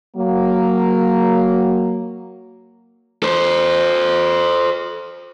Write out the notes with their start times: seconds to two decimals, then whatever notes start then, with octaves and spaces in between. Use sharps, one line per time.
0.16 F#3 A#3
3.23 A4 C5